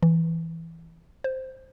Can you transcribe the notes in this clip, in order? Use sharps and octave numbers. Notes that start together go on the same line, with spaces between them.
E3
C5